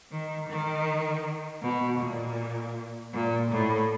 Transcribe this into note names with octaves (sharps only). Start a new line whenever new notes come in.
D#3
D#3
B2
A#2
A#2
A2